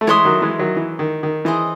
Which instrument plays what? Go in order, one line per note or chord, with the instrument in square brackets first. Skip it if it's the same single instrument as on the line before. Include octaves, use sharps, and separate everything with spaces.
[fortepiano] A3
[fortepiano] E3 G#3 [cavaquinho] C#5 E5 C6 D#6
[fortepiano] D#3 F#3
E3 G#3
D#3 F#3
E3
D#3
D#3
[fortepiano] E3 [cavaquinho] G#4 C5 D#5